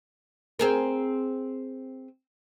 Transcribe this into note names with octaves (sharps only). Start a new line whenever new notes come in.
C4 G#4 A#4